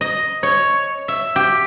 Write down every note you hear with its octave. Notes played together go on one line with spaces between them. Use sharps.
D#5
C#5
E5
G4